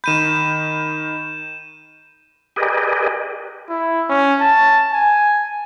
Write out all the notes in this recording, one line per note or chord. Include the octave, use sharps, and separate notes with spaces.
D#3 B5 G6 D#7 E7
G4 G#4 A#4 B4 D5 D#5
E4
C#4
A5
G#5